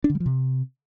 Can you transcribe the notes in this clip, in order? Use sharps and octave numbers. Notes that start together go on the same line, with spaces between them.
D4
D3
G3
F3
C3